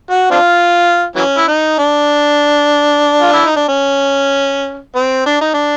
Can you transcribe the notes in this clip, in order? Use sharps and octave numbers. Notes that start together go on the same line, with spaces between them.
F#4
C4 D4 F4
E3 F#3 C#4
E4
D#4
D4
F4
E4
D#4
D4
C#4
C4
D4
D#4
D4